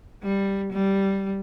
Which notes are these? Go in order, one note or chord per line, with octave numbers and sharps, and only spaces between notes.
G3
G3